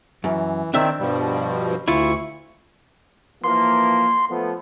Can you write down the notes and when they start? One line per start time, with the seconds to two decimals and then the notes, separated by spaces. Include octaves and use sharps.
0.24 F#2 E3
0.74 D#3 C4 D4 E5
1.00 G2 B2 F3 G3
1.88 D2 E4 F4 C#6
3.44 E3 F3 A#3 C6
4.30 F3 A3 B3